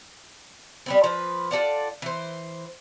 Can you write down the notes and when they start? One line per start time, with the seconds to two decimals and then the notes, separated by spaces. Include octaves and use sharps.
0.86 G3 B3 C4
1.04 F3 B4
1.51 F4 A4 D5 F#5
2.02 E3 C5